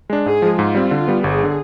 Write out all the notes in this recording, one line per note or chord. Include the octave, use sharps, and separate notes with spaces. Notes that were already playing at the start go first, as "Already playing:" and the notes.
G#3 D4
G#2 G#4
F3 G#3
G#2 F4
G3 C4
D3
G3 B3
G1 G#4
D3